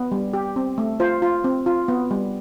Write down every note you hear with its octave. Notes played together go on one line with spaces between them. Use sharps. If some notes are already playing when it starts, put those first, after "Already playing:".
Already playing: B3
G3
G4
C4
A3
F4 C5
F4
C4
F4
B3
G3